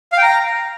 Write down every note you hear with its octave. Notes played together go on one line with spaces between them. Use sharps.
F5
G5
A#5